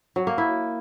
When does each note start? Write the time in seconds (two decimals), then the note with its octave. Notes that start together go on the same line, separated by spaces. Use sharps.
0.16 F#3
0.27 A#3
0.38 E4